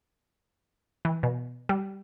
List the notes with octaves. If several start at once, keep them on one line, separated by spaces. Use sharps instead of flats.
E3
B2
G3